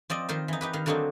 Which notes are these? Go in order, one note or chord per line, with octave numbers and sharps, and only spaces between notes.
F3 C4 D5 D#5
D#3 F4 C5
E3 D#4
D#4 G4 B4
D#3 F5
D3 F#3 A#3 C4 D4 D#4